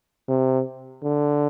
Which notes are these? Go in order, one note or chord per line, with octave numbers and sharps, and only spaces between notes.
C3
D3